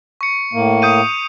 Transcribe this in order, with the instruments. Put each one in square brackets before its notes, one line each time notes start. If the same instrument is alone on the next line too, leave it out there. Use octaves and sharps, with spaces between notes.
[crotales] C#6 C#7
[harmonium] A2 A#3
[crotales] D#6 G6 D#7